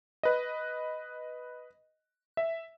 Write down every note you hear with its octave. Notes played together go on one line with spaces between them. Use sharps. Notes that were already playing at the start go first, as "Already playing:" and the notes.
B4 D#5
E5